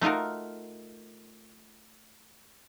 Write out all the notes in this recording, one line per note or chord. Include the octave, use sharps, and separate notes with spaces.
A3 D#4 F4 F#4 A#4